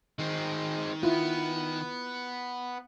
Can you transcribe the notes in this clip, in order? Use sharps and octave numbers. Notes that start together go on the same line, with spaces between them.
D#3 G#3 C4
B3 E4 F4